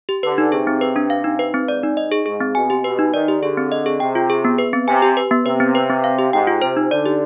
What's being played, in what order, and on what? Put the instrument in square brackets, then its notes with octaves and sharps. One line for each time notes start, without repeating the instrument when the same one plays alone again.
[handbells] G4
[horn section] D3 [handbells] B4
[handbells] D#4
[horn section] C3 [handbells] G#4
[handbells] C4
B4
D4
F5
D#4
B4
C4
[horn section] G#2 [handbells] D5
[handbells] D#4
D#5
G#4
[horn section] G#2 [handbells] G#4
[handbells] C4
[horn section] B2 [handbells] G#5
[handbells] G4
[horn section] B2 [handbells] B4
[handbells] D#4
[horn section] D#3 [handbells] D5
[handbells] G4
[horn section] D3 [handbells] G#4
[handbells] C4
D#5
G#4
[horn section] C3 [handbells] G5
[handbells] F4
G#4
B3
B4
C4
[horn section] C3 [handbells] G#5
[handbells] G4
B4
B3
[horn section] C3 [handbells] B4
[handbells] C4
B4
C4
F5
G4
[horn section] G#2 [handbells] G5
[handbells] F4
[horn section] C3 [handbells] C5
[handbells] D#4
[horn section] D3 [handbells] D5
[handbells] G4